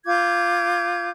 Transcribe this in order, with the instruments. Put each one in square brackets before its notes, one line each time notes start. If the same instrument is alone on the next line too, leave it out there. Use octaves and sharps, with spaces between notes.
[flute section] F4 D6 G6 G#6